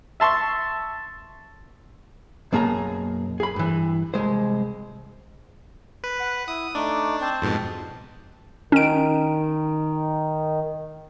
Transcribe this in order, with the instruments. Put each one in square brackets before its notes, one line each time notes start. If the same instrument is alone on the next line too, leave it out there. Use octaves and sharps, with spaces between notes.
[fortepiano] E5 A5 C6 C#6
[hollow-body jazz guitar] F#2 B2 A#3 G#4 G#5 A#5
G#4 B5
G2 E3
C2 B2 G#3 C5
[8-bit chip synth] B4
[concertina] F#5
[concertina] E4 [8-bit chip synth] D#6
[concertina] A3 D#4 D6 [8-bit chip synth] D4
[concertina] C4 C5 A5
[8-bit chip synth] F2 G#2 B2
[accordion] D#3 [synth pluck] C#4 D7